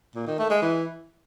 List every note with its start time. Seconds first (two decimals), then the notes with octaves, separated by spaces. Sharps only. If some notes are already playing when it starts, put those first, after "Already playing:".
0.15 A#2
0.27 D#3
0.38 A3
0.50 G#3
0.62 E3